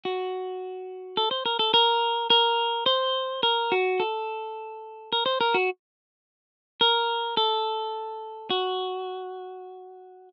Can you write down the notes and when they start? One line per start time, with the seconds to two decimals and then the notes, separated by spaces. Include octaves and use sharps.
0.05 F#4
1.17 A4
1.31 C5
1.46 A#4
1.59 A4
1.74 A#4
2.30 A#4
2.86 C5
3.43 A#4
3.72 F#4
4.00 A4
5.13 A#4
5.26 C5
5.41 A#4
5.54 F#4
6.81 A#4
7.37 A4
8.50 F#4